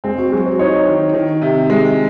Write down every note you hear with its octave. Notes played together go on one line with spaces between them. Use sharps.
G#3 C4
F#4
F#3 G#4
C5
D#4 C#5
D#3
D#3
C3
G#3